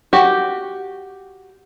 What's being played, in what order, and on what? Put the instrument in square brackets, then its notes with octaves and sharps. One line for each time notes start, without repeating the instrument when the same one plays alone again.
[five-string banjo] F#4 G4